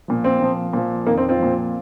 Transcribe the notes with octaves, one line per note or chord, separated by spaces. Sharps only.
A#2 F3
C4
A#2 F3
A#2 F3
F2 D#3 A#3
C4
C4 F4
A#2 F3